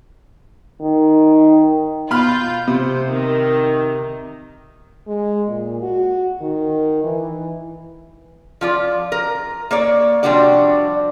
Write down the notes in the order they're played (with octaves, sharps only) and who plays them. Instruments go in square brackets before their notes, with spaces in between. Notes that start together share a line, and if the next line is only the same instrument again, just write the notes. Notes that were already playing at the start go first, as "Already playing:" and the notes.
[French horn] D#3
[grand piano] B2 B5 F6 [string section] F4 G6
[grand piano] C3 [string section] C5
[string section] D#3
[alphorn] G#3
A#2
F#4
D#3
E3
[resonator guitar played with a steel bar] F3 F4 D5
A#4
A#3 C#5 D5
C3 F3 G3 D4 F#4 D5